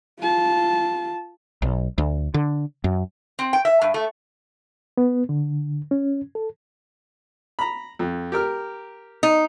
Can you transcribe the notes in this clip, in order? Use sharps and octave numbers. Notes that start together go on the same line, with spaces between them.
F4 A5
B1
D2
D3
F#2
C4
G5
E5
G2
A3
B3
D3
C#4
A4
A#5 B5
F2
G4 A#4 F6
D#4